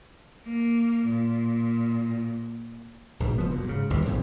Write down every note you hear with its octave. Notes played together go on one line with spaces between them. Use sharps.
A#3
A#2
A#1 G#2 B2
F1 F3 B3
F#2 A#2
G#2 C#3
G1 D#2 C3
A#1 F2 G#2 E3